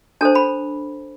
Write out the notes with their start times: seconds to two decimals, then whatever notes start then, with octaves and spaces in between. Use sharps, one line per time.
0.21 D4 A4 C5 A5
0.35 B5